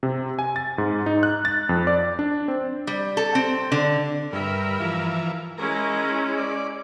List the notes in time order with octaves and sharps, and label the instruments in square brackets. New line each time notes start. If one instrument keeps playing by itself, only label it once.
[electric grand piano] C3
G#5
A6
G#2
D#4
F#6
A6
F2
D5
D4
C4
[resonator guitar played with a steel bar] G3
A4
C4
D3
[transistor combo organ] G2 [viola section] A#4 E5 B5
[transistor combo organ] E3 F3
[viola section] G#3 C#4 E4 [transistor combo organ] A#4
[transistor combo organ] D5